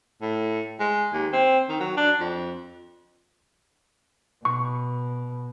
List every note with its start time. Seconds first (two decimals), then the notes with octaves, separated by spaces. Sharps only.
0.22 A2
0.80 G#3
1.13 D#2
1.33 C4
1.69 D#3
1.81 F#3
1.97 D4
2.20 F2
4.45 B2 C#6